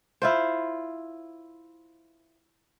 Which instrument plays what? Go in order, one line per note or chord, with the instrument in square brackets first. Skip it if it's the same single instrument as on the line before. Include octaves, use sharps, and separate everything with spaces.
[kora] E4 F4 C5